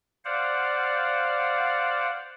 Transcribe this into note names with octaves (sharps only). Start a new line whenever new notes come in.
C5 D5 F5 F#5